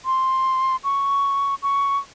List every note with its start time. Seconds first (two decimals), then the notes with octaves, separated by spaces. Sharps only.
0.05 C6
0.84 C#6
1.63 C#6